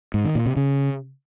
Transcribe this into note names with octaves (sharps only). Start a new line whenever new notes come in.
G#2
D#3
A#2
C3
C#3